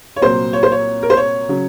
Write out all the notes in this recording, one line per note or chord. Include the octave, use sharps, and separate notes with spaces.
C#5
C2 A#2 F#3 C5
C#5
C5
C#5
A#4
C5
C#5
C#3 F#3